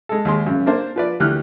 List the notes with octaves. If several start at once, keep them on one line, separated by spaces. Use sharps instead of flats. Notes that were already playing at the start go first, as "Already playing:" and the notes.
G#3 A4
D#2 G#3 C6
F#2 C#3
A#3 D4 C5
F3 B4 D5
D2 E3 G4 F6 F#6